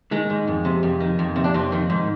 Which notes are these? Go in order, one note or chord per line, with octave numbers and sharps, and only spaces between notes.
D#3 G#3
G#2
F2
C3
F2
D#3
F2
C3
D4
F2 C4
D#3
G#2